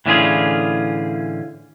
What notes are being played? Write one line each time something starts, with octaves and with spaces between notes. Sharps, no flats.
A2 D3 E3 C#4 F4 G#4